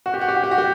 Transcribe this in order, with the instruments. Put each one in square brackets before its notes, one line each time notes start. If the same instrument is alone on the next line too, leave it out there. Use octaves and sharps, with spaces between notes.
[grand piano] F#4
G4
F#4
G4
F#4
G4
F#4
G4